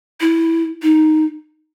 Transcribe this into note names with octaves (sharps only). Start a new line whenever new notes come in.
E4
D#4